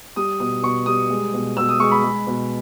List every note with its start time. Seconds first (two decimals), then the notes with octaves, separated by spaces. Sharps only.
0.16 G3 D#6
0.40 B2 D#6
0.63 B2 C#6
0.86 G3 D#6
1.10 G#3
1.33 B2
1.57 B2 E6
1.69 D#6
1.80 G#3 C#6
1.91 B5
2.04 G#3
2.27 B2